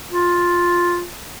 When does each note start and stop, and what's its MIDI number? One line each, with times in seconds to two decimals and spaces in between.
0.12 1.04 65